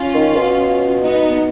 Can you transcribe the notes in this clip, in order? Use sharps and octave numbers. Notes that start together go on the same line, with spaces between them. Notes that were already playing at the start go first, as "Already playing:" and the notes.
Already playing: C#4 F4
D#3
B2
B3 D#4